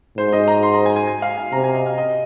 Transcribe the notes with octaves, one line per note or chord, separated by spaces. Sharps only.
G#2 C5
D#5
A#5
C6
A#5
G#5
G#5
G#5
F5
G#5
C3 A#5
G#5
D#5
F5
D#5